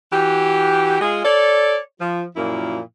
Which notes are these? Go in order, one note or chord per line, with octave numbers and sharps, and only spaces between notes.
E3 F#4 G4
G#3 F4 G#4
A4 C#5 D5
F3
F#2 A#2 F3 A#3 E4